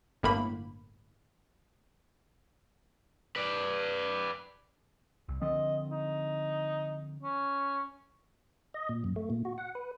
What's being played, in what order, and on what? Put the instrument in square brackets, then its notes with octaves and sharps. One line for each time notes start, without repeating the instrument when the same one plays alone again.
[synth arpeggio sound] G1 A2 A#3 B5
[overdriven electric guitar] B4 D5
[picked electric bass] C2
[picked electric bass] D3 F3 C4 [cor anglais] D#5
[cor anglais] D#4
C#4
[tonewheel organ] D#5
A#2
F#2
A3
A#2
F#4
F#5
B4